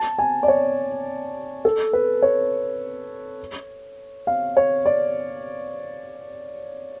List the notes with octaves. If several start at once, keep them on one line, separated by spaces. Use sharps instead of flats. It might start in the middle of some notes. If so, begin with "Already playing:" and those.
Already playing: A5
G#5
D5
C#5
A4
B4
C#5
F5
C#5
D5